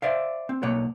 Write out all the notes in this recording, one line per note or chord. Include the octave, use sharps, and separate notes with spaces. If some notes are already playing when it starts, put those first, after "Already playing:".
C5 D5 E5 F5
C4
B1 B2 A#3 C#5 F#5